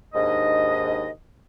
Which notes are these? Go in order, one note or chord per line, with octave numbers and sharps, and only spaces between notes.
D#2 G#2 D4 D#5